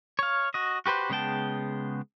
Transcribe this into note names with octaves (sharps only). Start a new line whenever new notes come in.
C#5 F5
F#4 D#5
F#4 G4 B4 C5
C#3 G#3 B3 G5 A5